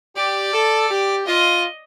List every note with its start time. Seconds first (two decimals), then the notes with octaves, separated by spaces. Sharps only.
0.16 G4 D5
0.53 A4
0.90 G4
1.26 F4 D#5